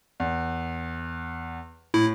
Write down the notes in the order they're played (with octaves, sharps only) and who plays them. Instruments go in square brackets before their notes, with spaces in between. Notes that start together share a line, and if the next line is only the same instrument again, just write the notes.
[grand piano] E2
[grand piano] A2 [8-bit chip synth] E4